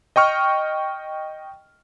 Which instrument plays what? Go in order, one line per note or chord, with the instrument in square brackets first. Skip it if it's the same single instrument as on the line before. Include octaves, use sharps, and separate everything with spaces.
[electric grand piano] D#5 G5 C#6 F6